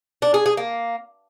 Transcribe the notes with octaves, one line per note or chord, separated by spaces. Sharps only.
D4
G#4
G#4
A#3